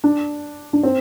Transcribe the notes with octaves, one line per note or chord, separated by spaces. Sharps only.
D4
D4
C4